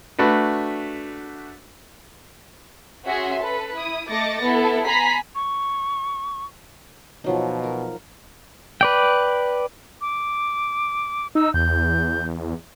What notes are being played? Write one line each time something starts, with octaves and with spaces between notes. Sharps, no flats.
A3 D4 F#4 B4
C#4 F#4 G#4 E5 C6
A4 B4
E4 D#6
A3 D#5 D6 A6 A#6 C#7
B3 E4 A4
G#5 A#5 B5 B6 C7
C#6
B2 F3 F#3 D#4
A#4
B4 D5 G5
D6
D#4 E6
E2 G6